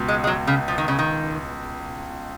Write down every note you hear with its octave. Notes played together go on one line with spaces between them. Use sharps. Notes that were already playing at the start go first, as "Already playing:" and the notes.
Already playing: C#2 B2
G#3
G#3
F#3
C#3
F3
D#3
C#3
D#3